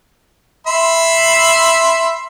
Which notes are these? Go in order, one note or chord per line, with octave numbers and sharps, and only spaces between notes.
E5 B5 C6